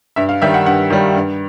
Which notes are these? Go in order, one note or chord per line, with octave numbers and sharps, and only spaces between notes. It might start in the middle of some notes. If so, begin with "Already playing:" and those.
G2 E5
F5
D#3 G3 E5
F#5
G2 F#5
D#3 G3
G2